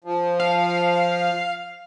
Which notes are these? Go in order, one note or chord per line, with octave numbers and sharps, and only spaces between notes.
F3
F5